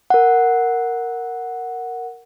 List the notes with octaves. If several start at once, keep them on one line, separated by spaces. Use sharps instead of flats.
A#4 F#5